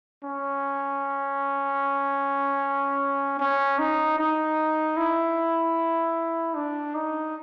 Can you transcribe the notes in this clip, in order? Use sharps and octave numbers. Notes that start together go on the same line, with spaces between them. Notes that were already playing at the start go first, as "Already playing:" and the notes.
C#4
C#4
D#4
D#4
E4
D4
D#4